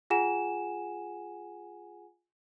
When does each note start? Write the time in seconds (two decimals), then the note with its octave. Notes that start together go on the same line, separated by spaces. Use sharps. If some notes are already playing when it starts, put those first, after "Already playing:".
0.10 F4 G#4 F#5 G#5 E7